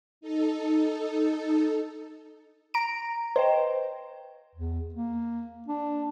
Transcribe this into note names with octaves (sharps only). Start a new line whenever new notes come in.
D#4 A4
A#5 D7
B4 C5 D#5 G5
E2
A#3
D4